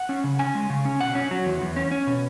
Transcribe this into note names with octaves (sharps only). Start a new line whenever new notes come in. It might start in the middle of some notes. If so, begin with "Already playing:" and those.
Already playing: F#5
C#4
C#3
C#4 G#5
G#3
C#3
C#4
B2 F#5
C#4
F#3
E2
E2
C#4
C#4
B2